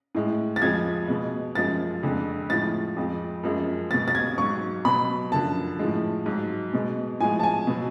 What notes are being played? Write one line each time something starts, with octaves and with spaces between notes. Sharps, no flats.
A2 G#3
A6
F2 F3 G#3 G#6
B2 G#3
F#2 F3 G#3 A6
F2 D3 G#3
A2 F3 G#3 A6
F2 F3 G#3
F#2 F3 G#3
B2 G#3 A6
A6
G#6
G#2 F#3 C#6
B2 F#3 B5
F#2 D3 F3 A5
A2 F3 G#3
G#2 F#3
B2 G#3
A2 F3 G#3 G#5
A5
G#5
B2 F#3